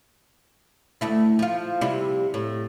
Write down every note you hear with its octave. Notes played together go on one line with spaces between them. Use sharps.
D2 A3 E4
F3 F4
C3 G3 E4
A2